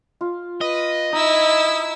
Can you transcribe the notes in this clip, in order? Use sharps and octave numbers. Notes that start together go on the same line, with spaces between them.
F4
B4 D#5
D#4 E4 E6